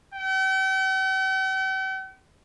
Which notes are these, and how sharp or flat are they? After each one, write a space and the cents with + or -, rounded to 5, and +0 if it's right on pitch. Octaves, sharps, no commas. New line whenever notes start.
G5 -45